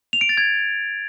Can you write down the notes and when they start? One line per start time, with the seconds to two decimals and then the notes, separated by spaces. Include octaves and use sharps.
0.13 F7
0.21 D7
0.29 A6
0.37 G#6